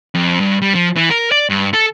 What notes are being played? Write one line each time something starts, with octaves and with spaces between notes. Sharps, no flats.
F2
G2
G3
F3
E3
A#4
D5
G2
A4